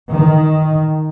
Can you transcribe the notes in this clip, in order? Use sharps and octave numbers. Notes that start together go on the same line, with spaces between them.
D#3